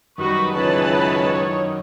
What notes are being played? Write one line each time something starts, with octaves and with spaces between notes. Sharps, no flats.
F#2 D#3 G3 F#4 B4 C#6
C#2 E3 B4 C#5 A5